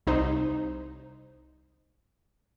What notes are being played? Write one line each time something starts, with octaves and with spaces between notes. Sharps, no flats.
C2 D#4 C5